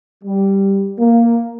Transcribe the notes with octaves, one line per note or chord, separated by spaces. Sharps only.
G3
A#3